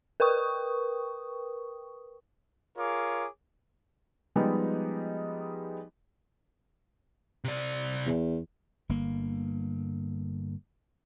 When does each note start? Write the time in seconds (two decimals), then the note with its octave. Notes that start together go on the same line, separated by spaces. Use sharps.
0.20 A#4 B4 G5 C#6 D#6
2.78 F4 G#4 A#4 C#5 D6
4.36 F3 G3 G#3 B3 D#4 G4
7.44 C3 D5
8.06 E2
8.89 G1 A#3